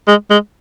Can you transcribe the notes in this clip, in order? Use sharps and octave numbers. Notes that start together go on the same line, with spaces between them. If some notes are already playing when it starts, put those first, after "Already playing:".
G#3
G#3